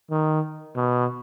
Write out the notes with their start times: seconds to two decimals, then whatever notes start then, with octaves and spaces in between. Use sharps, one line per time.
0.11 D#3
0.76 B2